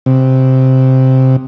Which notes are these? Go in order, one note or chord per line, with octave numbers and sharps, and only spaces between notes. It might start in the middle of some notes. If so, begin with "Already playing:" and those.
C3